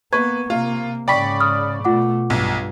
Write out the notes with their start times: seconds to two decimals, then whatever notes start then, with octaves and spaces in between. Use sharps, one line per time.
0.13 A#3 B3 B4 C#6 G#6
0.50 C3 A#3 F4
1.08 G#2 C#3 D5 G5 B5 C#6 B6
1.40 D#6 F6
1.85 B2 A3 F4 F#5 D6
2.30 B1 G2